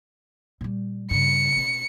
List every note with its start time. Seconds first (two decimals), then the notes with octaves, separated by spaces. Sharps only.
0.61 A#2 G3
1.11 G2 C#3 C#7
1.56 B2 C4